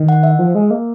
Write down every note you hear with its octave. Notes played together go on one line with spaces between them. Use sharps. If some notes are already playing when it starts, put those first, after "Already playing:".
Already playing: D#3
F#5
E5
F3
G#3
A#3